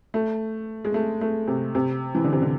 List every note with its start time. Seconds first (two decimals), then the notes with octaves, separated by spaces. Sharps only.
0.14 A3
0.85 G#3
0.94 A3
1.21 A3
1.48 C3
1.75 C3
2.15 E3
2.24 D3
2.33 C3
2.42 D3